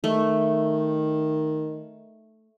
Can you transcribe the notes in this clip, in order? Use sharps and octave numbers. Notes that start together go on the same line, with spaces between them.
D#3 A3